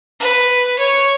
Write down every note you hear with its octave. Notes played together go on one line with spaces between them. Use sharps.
B4
C#5